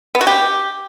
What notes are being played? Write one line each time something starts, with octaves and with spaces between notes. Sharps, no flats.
B3
F#4
G4